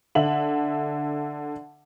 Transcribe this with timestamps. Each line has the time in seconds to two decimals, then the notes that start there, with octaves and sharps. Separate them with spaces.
0.15 D3 E5 F#7